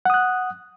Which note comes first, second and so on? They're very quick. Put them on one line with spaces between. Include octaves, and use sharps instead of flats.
F#5 D#6 F#6